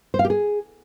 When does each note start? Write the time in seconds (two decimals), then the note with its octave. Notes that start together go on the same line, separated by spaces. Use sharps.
0.14 C5
0.19 F5
0.25 G4
0.30 G#4